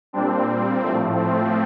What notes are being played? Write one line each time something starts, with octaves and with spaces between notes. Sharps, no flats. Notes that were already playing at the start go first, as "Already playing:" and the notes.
A#2 G3 C4 D4
C4
A2 F3 A3 C4
C4